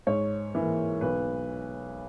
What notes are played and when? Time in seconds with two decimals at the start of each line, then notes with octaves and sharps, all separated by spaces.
0.07 G#2 C#5
0.55 E3 A#3
1.01 B1 B4